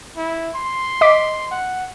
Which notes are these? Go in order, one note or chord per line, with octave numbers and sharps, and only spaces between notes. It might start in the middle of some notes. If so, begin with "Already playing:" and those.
E4
C6
D#5 D6 B6
F#5